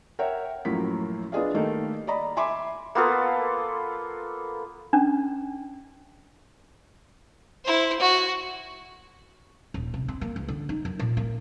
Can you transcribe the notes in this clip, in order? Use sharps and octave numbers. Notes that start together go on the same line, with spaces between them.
A#4 C#5 E5 F#5 G5
F#2 A2 F3 A#3 B6
B3 D4 F4 G#4 D#5 F5
D#3 G3 A3 A#3 D#4 A4
D5 D#5 A#5 B5
E5 G#5 B5 C6 D6
A#3 B3 F4 A4
C#4 D4
E4 C5
F#4
D#1
C3
C4
A#3
C#2
D3
D#4
F#2
A#2
A#3